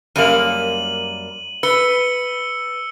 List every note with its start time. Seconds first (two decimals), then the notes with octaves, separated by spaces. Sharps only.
0.16 F#2 G3 A#3 D#7 F#7
1.63 B4 E6 C#7 G7